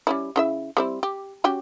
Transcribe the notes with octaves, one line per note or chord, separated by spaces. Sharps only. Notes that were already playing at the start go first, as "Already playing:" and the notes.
G3 C#4 E4
C#3 E4 E5
G3 C4 E4
G4
C#4 F#4 G4